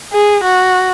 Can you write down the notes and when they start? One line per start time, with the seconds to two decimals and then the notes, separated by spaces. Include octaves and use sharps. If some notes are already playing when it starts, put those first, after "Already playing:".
0.13 G#4
0.44 F#4